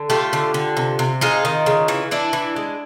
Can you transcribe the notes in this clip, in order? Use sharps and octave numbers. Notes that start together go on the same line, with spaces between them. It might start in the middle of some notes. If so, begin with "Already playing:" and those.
Already playing: D3
A3 F4 G4
D3
D3
C3
C3
G#3 D#4 F4
D#3
C#3
E3
E3 D4 E4
E3
G#3